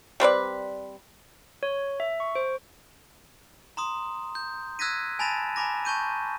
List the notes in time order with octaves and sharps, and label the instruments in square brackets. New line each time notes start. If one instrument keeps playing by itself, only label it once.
[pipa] G3 C4 B4 D5
[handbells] C#5
E5
C#6
C5
[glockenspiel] A#5 C6 D#6
G6
E6 F#6 G#6 A#6 B6 D#7
G#5 A5 B5 A6 A#6 E7
G#5 A#5 B5 D6 A#6
A5 C#6 G6 D#7